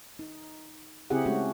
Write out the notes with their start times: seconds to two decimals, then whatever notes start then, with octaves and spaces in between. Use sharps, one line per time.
0.19 D#4
1.10 C#3 C4 E4 G4 G#4 F#5
1.26 G#3 A3 C#4 F#4